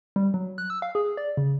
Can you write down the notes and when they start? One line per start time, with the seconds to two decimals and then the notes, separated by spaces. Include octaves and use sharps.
0.16 G3
0.34 F#3
0.58 F#6
0.70 E6
0.82 F5
0.95 G#4
1.17 D5
1.37 C#3